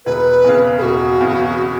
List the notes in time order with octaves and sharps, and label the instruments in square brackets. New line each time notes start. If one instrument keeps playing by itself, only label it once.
[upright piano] E1 [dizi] B4
[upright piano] E2 C#3
[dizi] A4
[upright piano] E1 [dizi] F#4
[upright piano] E2 C#3